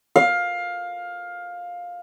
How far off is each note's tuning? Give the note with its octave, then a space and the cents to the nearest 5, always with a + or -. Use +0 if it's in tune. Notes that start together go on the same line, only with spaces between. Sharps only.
F5 +15